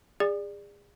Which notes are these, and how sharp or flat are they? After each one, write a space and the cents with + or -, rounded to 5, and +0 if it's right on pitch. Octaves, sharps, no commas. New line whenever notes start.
G#4 -30 D5 +10